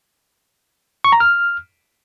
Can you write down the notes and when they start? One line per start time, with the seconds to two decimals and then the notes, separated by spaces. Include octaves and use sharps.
1.04 C#6
1.12 A#5
1.20 F6